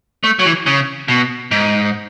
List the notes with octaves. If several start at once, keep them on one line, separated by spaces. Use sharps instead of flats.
A3
F#3
E3
C#3
B2
G#2